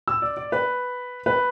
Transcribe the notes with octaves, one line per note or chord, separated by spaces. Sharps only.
E6
D5
D5
B4
B4